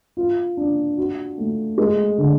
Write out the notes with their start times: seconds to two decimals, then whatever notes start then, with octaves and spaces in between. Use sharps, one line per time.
0.17 F4
0.57 D4
0.98 F#4
1.38 A3
1.78 G#3
2.18 D3